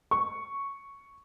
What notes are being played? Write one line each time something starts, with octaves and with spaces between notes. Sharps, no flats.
C#6